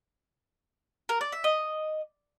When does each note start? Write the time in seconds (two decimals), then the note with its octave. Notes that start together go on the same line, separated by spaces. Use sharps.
1.09 A#4
1.21 D5
1.32 E5
1.44 D#5